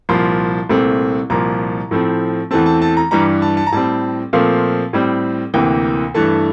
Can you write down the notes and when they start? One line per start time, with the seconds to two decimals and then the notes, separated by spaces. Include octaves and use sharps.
0.09 C2 A#2 F3 C6
0.69 C2 A#2 A3 C4
1.30 C2 A#2 F3 A#5
1.91 A2 F3 A3 C4
2.51 E2 E3 A3 C4 A5
2.66 A5
2.82 A5
2.97 A#5
3.11 G2 E3 G3 A#5
3.42 A5
3.57 A5
3.67 A#5
3.72 A2 G3 C4 A5
4.33 A#2 F3 A3 C4 F5
4.93 A2 G3 C4
5.54 D2 C3 E3 A#3 G5
6.14 G2 E3 A3 A5